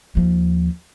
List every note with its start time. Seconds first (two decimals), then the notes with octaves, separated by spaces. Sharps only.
0.15 D#2 F3